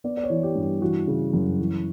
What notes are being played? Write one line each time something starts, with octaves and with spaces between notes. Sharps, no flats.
B3 D5
D5
C#5
E3
G4
G2
G4
E3 F#4
C#3
F#2
E3